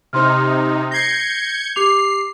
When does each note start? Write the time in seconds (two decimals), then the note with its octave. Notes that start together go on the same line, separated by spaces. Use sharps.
0.13 C3 D#4 C5 C6 F6
0.91 G6 G#6 A#6 C7 C#7
1.76 G4 D6 C7 F7